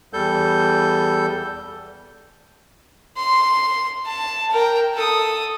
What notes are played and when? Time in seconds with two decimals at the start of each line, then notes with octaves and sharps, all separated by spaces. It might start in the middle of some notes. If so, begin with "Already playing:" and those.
0.13 E2 G3 A4 G6
3.17 C6
4.06 A5
4.51 A#4 G5
4.94 A4 D#6